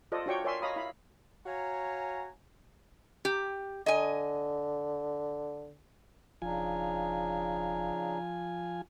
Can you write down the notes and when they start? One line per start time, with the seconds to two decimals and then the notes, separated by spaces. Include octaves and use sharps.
0.12 F4 A4 C5 D5 D#5
0.26 D4 F4 F#4 C#5 G5 C#6
0.44 A#4 C#5 D5 E5 G#5 C6
0.62 C#5 D#5 F5 A#5 B5 D#6
0.76 E4 F5 B5
1.46 F#4 C#5 F5 G#5 A#5
3.25 G4
3.86 D3 D#5 G#5
6.42 E1 C#3 F3 D4 D#4 F4 G#5